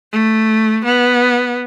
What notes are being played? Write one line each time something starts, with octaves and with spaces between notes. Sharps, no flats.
A3
B3